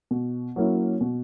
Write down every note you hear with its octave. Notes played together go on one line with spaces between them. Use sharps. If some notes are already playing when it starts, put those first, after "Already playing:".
B2
F#3 A#3 C#4 E4
B2